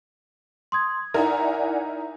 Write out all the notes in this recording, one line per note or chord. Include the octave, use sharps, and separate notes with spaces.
C6 D#6 G#6
D#4 E4 A#4 D5 E5 F#5 G#5 A#5